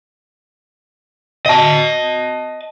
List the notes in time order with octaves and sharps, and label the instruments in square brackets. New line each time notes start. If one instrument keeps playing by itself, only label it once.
[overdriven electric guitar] D#5 A5